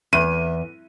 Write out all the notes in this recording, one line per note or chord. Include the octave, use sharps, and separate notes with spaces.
E2 D#7